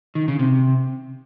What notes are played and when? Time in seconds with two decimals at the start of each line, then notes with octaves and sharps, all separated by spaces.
0.15 D#3
0.28 C#3
0.39 C3